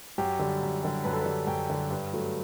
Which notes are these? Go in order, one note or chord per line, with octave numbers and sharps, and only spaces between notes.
F#2 G4
D3 G3
F#2
D3 G3
F#2 B4
A4
B4
D3 G3
F#2 G5
D3 G3
G2
F#3 A3